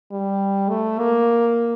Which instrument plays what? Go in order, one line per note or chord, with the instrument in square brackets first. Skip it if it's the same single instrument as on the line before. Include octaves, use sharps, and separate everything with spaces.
[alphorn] G3
A3
A#3